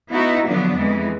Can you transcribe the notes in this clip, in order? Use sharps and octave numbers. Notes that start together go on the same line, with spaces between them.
B3 D#4 E4 F#4
D3 F3 F#3 B3 D4
F2 E3 G#3